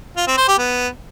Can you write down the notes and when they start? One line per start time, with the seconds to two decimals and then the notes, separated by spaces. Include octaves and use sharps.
0.17 F4
0.27 C4
0.38 C5
0.48 G4
0.59 B3